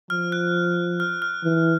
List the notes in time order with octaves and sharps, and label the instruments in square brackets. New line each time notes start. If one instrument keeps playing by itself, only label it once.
[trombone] F3 [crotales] F6
[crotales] F#6
F6
F6
[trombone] E3